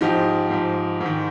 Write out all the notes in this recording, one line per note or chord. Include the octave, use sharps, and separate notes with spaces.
G#2 F3 D#4 G4
G#2 F3
G#2
D#3